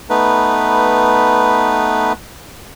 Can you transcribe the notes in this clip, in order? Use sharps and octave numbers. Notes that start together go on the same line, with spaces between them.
A3 B3 D#4 B4